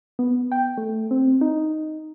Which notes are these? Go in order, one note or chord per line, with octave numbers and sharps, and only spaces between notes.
B3
G5
A3
C4
D#4